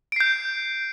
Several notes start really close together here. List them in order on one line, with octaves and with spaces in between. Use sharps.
D7 C7 G6